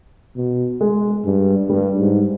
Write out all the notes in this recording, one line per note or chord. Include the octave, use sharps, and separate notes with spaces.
B2
G#3
G2
G2 G3
G#2